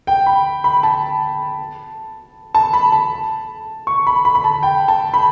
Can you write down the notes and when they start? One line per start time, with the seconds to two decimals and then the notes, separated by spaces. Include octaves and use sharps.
0.07 G5
0.26 B5
0.64 B5
0.83 A5
2.55 A5
2.73 B5
2.92 A5
3.87 C#6
4.07 B5
4.25 B5
4.35 B5
4.44 A5
4.63 G5
4.88 A5
5.14 B5